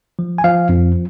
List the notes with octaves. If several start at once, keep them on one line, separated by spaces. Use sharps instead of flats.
F3
G#5
F3 F5
F2